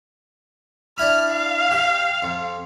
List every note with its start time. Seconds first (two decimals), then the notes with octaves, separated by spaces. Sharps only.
0.98 D4 E4 B5 F6
1.30 F5
1.71 G4
2.22 F2